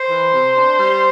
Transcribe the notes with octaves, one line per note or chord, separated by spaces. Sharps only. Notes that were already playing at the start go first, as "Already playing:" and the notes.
Already playing: C5
E3
C3
D4
G3